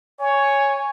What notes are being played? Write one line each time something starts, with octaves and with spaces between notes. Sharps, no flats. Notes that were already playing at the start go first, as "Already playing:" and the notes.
C#5 G#5